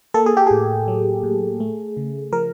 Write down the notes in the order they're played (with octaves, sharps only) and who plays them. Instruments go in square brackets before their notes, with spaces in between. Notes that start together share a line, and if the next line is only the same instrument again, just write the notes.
[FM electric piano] A#3 A4
G#4
G4
A2 G#4
F#3
A2
A3
C#3
F3 A#4